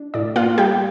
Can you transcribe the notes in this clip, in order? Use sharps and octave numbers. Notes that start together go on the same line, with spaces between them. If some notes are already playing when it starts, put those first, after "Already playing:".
Already playing: D4
A2 D5
A#3 F4 F5
G3 G4 G5